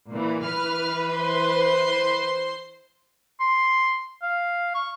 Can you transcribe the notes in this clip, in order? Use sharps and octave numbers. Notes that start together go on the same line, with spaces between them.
A#2 E3
E3 B4 F6
C5 C6
C6
F5
C#6